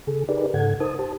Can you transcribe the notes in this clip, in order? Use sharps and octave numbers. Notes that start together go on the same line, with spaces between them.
C#3 G#4 A4
D#4 G4 G#4 A#4 B4 D5
G#2 C#3 A4 F#5 G#6
D#4 A#4 C5 A5 D#6
G4 C5 A5